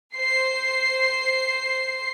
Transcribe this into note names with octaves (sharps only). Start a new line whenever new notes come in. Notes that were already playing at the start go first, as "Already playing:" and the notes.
C5 C7